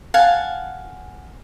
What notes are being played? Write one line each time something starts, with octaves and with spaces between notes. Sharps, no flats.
F5 F#5 G#5 A5